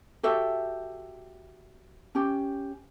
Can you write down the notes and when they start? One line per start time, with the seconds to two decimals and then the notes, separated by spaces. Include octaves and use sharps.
0.23 F#4 G4 A4 E5
2.15 C#4 G4